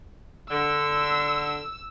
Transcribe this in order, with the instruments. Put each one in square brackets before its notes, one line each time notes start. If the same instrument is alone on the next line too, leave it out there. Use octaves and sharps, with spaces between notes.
[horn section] D3 [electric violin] E6